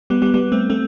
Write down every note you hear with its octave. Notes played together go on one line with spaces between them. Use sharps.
G3 B3
G3 B3
G3 B3
A3 C4
A3 C4